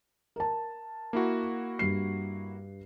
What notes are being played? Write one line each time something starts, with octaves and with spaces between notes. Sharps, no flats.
A#4 A5
A#3 E4 F#4
G2 C7